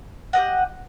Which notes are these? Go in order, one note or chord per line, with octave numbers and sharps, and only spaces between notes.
G4 B4 D#5 F#5